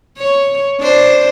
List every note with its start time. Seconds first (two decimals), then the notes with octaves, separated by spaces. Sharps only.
0.18 C#5
0.80 D4 C5